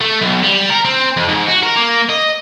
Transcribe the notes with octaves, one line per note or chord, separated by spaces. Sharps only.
A3
B1
G3
A#4
C4
F2
G#2
F#4
A#4
A#3
D#5